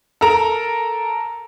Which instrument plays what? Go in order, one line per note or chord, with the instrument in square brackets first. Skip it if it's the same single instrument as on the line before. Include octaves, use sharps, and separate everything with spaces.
[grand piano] A4 A#4 A#5